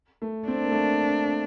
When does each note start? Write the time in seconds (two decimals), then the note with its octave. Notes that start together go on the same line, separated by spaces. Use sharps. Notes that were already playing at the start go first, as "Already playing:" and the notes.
0.22 A3
0.48 C4 D4
0.62 A#3
0.71 A3
0.75 A#3